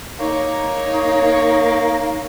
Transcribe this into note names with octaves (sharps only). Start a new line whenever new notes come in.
A#3 D#4 C#5